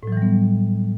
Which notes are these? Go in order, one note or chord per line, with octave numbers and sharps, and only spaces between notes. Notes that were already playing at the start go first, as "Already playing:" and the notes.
A2 E3 F#3 G3 B3